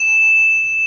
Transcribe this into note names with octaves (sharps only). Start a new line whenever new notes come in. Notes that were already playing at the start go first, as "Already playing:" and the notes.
Already playing: E7